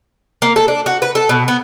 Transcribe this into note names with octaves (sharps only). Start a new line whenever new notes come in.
A#3
A4
D4
F#4
B4
A4
B2
B3